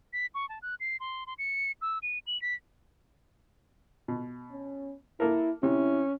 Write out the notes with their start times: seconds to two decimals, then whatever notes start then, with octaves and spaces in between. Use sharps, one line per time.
0.13 B6
0.35 C#6
0.49 A5
0.62 F#6
0.80 C7
1.00 C6
1.27 C6
1.39 C#7
1.82 E6
2.03 D#7
2.27 F#7
2.42 B6
4.08 B2
4.51 C#4
5.20 A#3 E4 A4 A#4
5.63 C3 C#4 E4